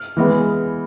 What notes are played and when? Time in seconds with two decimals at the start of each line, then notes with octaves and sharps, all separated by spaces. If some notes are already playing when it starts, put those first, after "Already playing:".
Already playing: F6
0.17 E3 G#3 B3